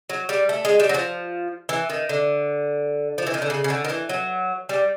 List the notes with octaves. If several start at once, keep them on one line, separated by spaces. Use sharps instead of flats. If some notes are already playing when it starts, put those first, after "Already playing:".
F#3
G3
A3
G#3
G3
F#3
F3
E3
D#3
D3
F3
E3
D#3
D3
C#3
C#3
D3
D#3
E3
F#3
G3